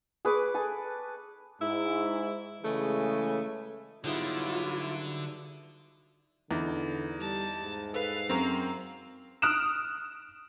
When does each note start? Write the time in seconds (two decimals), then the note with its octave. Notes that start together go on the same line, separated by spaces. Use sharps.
0.25 G#4 B4 C#6 D6
0.55 A4 G#5
1.60 G#2 E4
2.63 C#3 E3 G#3 A3
4.04 G#2 D3 F#3 G3 B3 E4 F4
6.51 E2 D3 D#4
7.20 G3 A5
7.62 G#2
7.94 A4 B4 F5
8.30 F#2 C4 A#5
9.42 D#6 F6 F#6 D7 E7